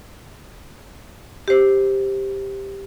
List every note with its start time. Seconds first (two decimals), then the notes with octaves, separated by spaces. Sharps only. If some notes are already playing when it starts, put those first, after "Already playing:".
1.48 G4 C5